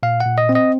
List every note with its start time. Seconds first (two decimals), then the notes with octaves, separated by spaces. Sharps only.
0.03 A#2 F5
0.20 F#5
0.26 A#2
0.38 D#5
0.49 C4
0.55 D#5